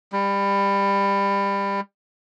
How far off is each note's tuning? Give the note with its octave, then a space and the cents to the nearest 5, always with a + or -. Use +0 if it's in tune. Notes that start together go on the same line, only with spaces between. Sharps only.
G3 +25